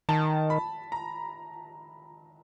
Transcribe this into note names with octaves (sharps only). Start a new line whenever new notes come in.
D#3 A5
B5
A#5